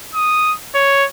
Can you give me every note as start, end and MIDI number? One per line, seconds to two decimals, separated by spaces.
0.15 0.54 87
0.75 1.06 73